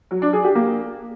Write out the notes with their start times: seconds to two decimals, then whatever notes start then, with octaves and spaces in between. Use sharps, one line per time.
0.11 F#3
0.22 D4
0.33 G#4
0.44 G4
0.55 A#3